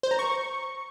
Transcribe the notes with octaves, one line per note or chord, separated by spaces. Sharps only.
C5
A#5
C#6